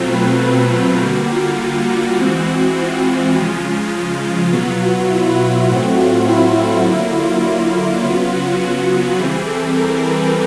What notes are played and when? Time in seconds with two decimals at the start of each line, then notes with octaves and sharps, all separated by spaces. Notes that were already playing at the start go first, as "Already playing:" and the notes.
Already playing: B2 F#3 A3 C4 F4
0.15 B4
0.74 B4
1.02 D3 G3 A#3 F#4
1.31 F4
1.61 F4
1.90 F#4
2.19 E3 G#3 C4
2.77 F4
3.06 F4
3.35 C#3 F3 G#3
4.23 F4
4.52 B2 F#3 B3 F4
4.81 F#4
5.10 E4
5.40 F4
5.69 A2 F#3 A3 C4 F#4
5.98 F4
6.28 E4
6.86 D3 F#3 A#3 E4
7.15 F4
7.44 F4
7.73 F4
8.02 C#3 F#3 B3 F4
8.32 F#4
8.90 F#4
9.19 E3 G3 C4 G#4
9.48 A4
9.77 A#4
10.06 B4